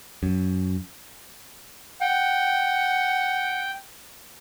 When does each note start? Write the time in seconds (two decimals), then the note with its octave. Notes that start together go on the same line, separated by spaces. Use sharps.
0.23 F#2
2.01 F#5 G5